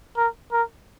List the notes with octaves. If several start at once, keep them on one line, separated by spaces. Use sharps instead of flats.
A#4
A#4